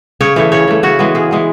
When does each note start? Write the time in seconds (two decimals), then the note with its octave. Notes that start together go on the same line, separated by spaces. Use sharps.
0.21 C#3 C#5
0.36 E3 A3 C#5
0.52 C#3 C#5
0.68 E3 A3
0.83 C#3 F#4
0.99 E3 G#3 B3
1.15 C#3 G#4
1.31 E3 G#3 B3